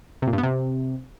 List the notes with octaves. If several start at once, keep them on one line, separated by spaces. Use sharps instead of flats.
C3
A#2
G2
B3
C3